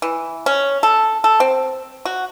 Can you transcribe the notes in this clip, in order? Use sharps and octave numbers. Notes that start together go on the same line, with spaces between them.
E3
C#4
A4
A4
C4
F#4